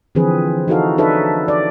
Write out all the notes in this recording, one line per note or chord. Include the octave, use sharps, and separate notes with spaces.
D3 E3 F3 C4 G#4 B4
D#4 E4 F#4 A4 F5
D4 D#4 A4 B4 C#5 E5
D5